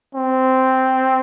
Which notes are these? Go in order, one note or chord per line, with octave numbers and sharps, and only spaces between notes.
C4